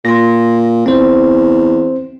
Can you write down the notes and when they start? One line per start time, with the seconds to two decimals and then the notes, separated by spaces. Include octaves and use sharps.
0.05 A#2 C6 A#6
0.86 E2 C4 C5